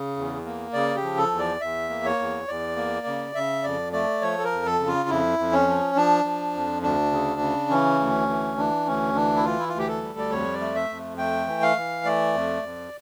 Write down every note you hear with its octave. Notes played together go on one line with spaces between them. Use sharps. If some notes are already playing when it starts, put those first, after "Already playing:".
Already playing: C#3
E2
A#3
C#3 D5
G4
F3
A4
E2
D5
E2 E5
A#3
C#5
E2
E2 D5
A#3
C#3
C#3 E5
F2 D5
A3 D5
F3 C#5
A4
A#4
F2
A4
C#3
F4
F2 E4
F2
C#4
F3
F3 D4
F3
F2
D2 D4
C#3
C#3
E3 C#4
D2
E3
E3 D4
D2 C#4
E3 D4
E4
E3 F4
E4
F4
D2 G4
A4
G3
D5
F2 C#5
D5
A3
E5
F2
A3 G5
E3
F5
E3
A3 D5
F2
F2